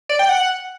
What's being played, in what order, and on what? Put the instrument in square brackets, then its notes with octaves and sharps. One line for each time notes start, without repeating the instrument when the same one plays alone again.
[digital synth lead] D5
G5
F#5